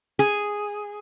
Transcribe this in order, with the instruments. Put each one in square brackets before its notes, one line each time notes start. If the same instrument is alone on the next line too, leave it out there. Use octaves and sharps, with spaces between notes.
[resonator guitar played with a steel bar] G#4